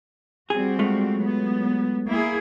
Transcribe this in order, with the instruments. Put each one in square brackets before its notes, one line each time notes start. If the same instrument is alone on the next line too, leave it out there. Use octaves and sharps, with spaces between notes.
[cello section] G3 C4 F#4 [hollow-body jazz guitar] G#4
[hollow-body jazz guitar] G#3 A3 F4
[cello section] F#3 B3
A#3 E4 G#4